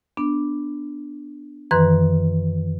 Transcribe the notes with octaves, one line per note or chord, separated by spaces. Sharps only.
B3 D4
F#2 D#3 E3 B4 C6 F#6